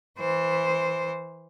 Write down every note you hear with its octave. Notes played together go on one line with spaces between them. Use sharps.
E3 C5